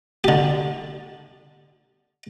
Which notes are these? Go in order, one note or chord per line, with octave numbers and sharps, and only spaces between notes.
D3 G4